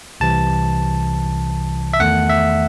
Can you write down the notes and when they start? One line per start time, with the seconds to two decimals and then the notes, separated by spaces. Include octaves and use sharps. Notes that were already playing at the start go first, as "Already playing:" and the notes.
0.20 C2 C3 E3 A5
1.93 E5
2.00 E2 D#3 A3 F#5
2.29 E5